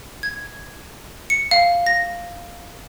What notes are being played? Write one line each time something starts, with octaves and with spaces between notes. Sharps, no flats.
G#6
C#7
F5
A#6